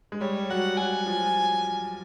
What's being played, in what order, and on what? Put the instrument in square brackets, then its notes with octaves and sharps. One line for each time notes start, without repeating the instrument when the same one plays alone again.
[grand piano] G#3
[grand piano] G3 [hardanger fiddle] C#5
[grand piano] F#3 [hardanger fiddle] F#5
[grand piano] F#3 [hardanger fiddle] G#5
[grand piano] F3